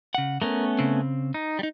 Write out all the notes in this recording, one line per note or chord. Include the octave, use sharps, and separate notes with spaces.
C#3 F#5
A3 B3 C#4 A#4
C#3 C4
D#4
G3 D#4